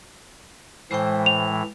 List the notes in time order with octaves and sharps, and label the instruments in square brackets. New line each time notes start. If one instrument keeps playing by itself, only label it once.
[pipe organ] A2 E3 [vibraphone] G#3 G5 [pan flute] C5
[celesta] F7